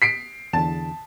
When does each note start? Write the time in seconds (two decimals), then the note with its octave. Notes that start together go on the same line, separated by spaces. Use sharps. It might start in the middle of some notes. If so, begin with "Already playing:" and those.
0.02 B6 C7 D7
0.53 E2 D3 A5